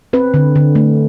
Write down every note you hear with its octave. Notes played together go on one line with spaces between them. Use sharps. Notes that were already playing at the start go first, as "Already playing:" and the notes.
C4 B4
D3
D3
A3